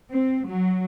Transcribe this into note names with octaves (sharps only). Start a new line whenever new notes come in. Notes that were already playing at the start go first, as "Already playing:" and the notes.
C4
F#3